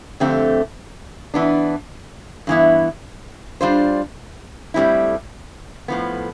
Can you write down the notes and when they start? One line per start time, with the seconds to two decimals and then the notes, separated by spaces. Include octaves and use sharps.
0.20 F2 D3 A3 C4 G4
1.34 E3 B3 D4
2.47 G2 E3 B3 E4
3.61 G3 D4 F4 C5
4.74 A2 G3 C4 E4
5.88 A2 F3 B3